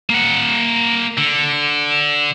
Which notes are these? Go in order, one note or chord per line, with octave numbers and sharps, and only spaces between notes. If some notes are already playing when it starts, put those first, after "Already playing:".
A#3 F#5
D3